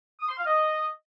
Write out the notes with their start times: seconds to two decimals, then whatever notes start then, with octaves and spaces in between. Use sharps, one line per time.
0.20 D#6
0.29 C6
0.38 F5
0.46 D#5